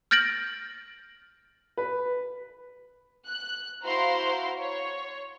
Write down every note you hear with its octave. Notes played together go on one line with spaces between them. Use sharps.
F6 G6 A6 A#6 D7 F#7
B4
F#6
E4 F#4 C5 F5 A#5 C6
C#5